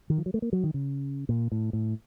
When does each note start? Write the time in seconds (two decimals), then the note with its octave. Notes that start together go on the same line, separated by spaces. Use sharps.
0.10 D#3
0.18 F3
0.26 F#3
0.34 A3
0.42 A#3
0.53 F#3
0.64 D#3
0.74 C#3
1.29 A#2
1.52 A2
1.73 A2